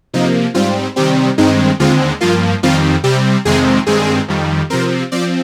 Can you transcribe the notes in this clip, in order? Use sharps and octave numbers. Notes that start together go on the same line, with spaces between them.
C3 F3 A#3 D#4
G#2 G3 C4 F4
C3 D#3 G3 C4 G4
G2 D#3 G#3 C4 D#4
D#2 D3 G#3 C4 F4
G2 F3 A#3 F4
F2 D#3 G3 C4 F4
C3 G3 C4 G4
F2 C3 D#3 G#3 C4 G#4
G2 D#3 G#3 C4 G#4
F2 D#3 G3
C3 F3 C4 A#4
F3 C4 D5